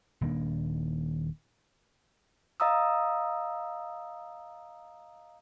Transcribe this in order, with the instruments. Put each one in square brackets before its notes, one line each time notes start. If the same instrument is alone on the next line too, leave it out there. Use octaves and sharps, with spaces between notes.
[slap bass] D#1 D#3 A#3 D4
[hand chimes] D#5 F5 A#5 D#6 E6